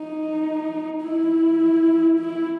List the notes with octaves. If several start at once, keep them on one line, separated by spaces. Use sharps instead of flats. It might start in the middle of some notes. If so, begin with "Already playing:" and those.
Already playing: D#4
E4
E4